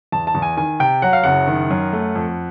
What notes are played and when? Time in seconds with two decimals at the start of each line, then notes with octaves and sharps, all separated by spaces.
0.12 E2 A5
0.27 A5
0.35 E2
0.42 G#5
0.57 D#3 G#5
0.80 C3 G5
1.02 F#3 F#5
1.13 F5
1.23 F#1 F#5
1.47 D#3
1.70 F#2
1.93 A3
2.15 F2